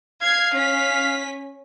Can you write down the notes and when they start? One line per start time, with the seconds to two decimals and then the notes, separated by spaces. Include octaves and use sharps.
0.22 F5 G#6 C7
0.54 C#4 B6